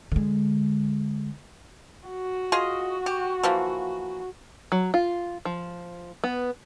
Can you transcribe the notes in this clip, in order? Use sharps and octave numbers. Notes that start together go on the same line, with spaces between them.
D3 G#3
F#4
F4 G#4 D#5
G4
E3 F3 A#3
F#3
F4
F3
B3